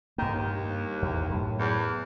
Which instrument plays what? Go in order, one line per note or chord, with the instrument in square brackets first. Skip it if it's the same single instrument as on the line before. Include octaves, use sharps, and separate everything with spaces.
[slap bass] G2 A#3 [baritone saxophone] D#3
[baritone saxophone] D#2
[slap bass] E2
F#2 A2
[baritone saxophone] E2